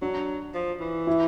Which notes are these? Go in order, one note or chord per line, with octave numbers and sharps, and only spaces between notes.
F#3 D4
F3
E3
E4